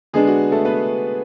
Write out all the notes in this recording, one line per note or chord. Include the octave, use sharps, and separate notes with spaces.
D3 G#3 B3 D4 G#4
F#4
A3 A4
B3 B4